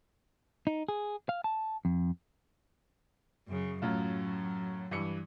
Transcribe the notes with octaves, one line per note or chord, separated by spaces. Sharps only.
D#4
G#4
F5
A5
F2
F#2 C#3
F#2 A2 F#3 F4
G2 E3 C#7